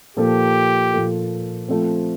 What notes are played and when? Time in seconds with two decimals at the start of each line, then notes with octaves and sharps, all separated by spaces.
0.17 A#2 F3 A#3 F4 G4 A4
0.93 A#2 F3 A#3 F4 A4
1.68 F3 A3 C4